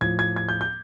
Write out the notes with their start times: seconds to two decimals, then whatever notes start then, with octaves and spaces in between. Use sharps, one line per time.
0.01 A2 F3 G#6
0.19 G#6
0.36 G#6
0.49 G6
0.61 G6